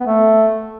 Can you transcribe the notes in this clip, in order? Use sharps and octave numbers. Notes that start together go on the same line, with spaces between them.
B3
A3